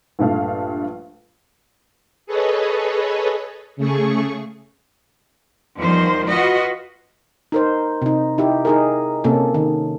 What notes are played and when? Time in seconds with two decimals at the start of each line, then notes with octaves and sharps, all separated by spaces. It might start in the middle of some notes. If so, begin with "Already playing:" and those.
0.19 A#1 G2 A3 F5
2.26 G#4 A4 B4 C#5 D#5
3.76 C#3 A3 G#4 C#6
5.76 E2 D#3 F3 G3 C5
6.26 F4 F#4 B4 D#5
7.52 D#4 A#4 C5
8.02 C3 D#4
8.38 D#4 E4 G4
8.65 D#4 G#4 A#4
9.24 C3 A#3 C#4 A4
9.54 D#3